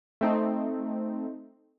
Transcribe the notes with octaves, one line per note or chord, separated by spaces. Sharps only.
A3 C4 D#4